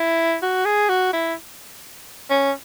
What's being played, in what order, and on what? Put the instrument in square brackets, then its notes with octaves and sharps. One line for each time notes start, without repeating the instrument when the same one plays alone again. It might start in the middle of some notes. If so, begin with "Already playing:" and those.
Already playing: [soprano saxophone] E4
F#4
G#4
F#4
E4
C#4